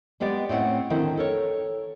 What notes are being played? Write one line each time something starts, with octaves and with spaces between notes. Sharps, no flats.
G3 G#3 B3 G4 D5
A2 C4 C#4 D#5 F#5
D3 D#3 C4 E4
A4 A#4 C#5